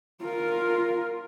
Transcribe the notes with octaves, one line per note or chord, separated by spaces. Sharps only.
F4 A#4